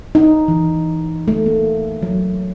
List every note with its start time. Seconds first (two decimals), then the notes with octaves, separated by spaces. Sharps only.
0.15 D#4
0.48 E3
1.28 A3
1.46 A#3
2.03 F#3